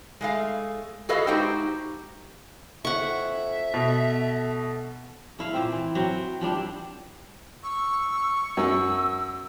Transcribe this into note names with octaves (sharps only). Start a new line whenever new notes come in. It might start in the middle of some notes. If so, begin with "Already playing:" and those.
G#3 A3 F5
F#4 G#4 A4 B4 D#5 F5
G#3 D#4 F#4 G4 C5 G5
F2 E5 F#5 C#6
B2 A4
A3 E4 F5
A#2 C4
E3
F#3 C4
F3 G3 D4 E4
C#6 E6
F#2 E6